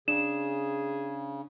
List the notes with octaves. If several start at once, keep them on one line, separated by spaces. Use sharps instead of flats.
C#3 D4 G#4 E7